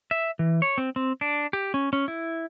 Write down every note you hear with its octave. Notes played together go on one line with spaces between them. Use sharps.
E5
E3
C#5
C4
C4
D4
G4
C#4
C#4
E4